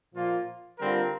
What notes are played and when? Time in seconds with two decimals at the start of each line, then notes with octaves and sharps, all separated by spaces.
0.14 A#2 F3 A#3 F4
0.79 D3 G3 C4 F4 A#4